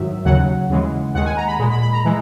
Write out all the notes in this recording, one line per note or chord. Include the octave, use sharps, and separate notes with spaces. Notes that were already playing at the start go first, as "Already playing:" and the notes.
Already playing: G#2 D#3 F#3 E5
D#2 C#3 F#3 F#5
D#2 C#3 E3 G#3
D#2 D#3 G#3 F#5
G#5
A#5
B5
A#2 G#3
B5
B5
A#5
E3 G#3